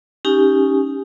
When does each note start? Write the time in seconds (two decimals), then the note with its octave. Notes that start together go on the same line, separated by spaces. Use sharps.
0.25 C#4 D#4 G4 G#5